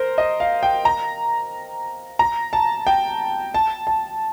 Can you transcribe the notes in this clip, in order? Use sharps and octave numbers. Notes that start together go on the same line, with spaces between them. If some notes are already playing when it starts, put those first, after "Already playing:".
Already playing: A#4 C5
D#5
F5
G5
A#5
A#5
A5
G5
A5
A5